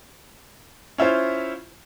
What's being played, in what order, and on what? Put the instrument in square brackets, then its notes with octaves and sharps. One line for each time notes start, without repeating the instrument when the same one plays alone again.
[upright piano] C#4 E4 F4 C5